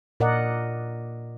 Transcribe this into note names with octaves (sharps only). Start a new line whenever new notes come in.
A#2 A#4 D5 D#5 F#5